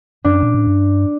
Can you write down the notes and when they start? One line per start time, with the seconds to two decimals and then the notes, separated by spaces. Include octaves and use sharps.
0.24 F#2 D4
0.43 A#2
0.54 A2
0.67 G2